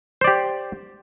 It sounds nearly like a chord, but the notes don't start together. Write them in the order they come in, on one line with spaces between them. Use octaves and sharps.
C5 D5 G4